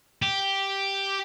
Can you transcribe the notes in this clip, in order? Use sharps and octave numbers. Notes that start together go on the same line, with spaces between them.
G4